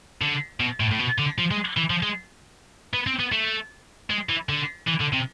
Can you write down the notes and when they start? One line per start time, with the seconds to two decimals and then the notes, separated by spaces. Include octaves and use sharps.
0.22 D3
0.60 B2
0.80 A2
0.91 A2
0.99 B2
1.18 D3
1.38 F3
1.51 G#3
1.77 E3
1.90 F3
2.03 G#3
2.94 B3
3.07 C4
3.19 B3
3.32 A3
4.10 G#3
4.29 E3
4.49 D3
4.88 E3
5.01 D3
5.14 C3